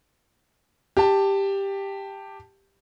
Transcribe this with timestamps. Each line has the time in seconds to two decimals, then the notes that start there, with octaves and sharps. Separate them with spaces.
0.97 G4 A5